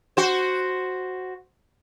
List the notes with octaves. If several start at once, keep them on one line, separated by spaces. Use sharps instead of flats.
F#4 C5